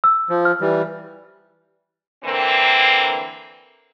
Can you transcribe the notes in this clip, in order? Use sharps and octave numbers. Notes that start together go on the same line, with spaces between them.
E6
F3
F6
E3 G3
D3 E3 A#3 C4